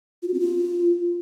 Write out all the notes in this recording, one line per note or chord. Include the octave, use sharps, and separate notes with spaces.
F4
F#4
C4
F4